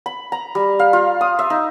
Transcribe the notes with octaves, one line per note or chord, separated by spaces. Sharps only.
B5
A#5
G3
F5
F4
D#6
E5
D#4